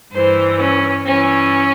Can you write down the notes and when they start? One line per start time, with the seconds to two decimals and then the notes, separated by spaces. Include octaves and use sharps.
0.12 G2 E3 C5
0.59 C#4
1.05 G2 E3 C#4